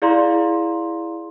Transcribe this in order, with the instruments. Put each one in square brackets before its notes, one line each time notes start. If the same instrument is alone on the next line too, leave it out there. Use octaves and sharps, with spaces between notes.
[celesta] E4 G#4 D5 F5 A#5 C6